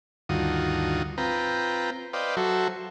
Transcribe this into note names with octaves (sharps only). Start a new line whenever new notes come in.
D2 G2 D#3 F4 F#4 D#6
C4 F4 B4 G5 A#5
B4 C5 D5 D#5 F5 G5
F#3 F#4 A4 C5 E5